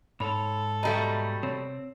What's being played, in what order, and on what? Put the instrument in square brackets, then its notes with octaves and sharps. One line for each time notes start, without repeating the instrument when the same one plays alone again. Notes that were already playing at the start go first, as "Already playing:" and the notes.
[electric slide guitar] G#2 C#5 [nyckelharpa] A4 [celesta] B5
[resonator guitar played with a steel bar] B2 G3 A3 [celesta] D#5 A#5
[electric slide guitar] C3 C4 [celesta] C#5